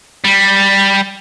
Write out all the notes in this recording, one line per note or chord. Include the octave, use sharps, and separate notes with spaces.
G3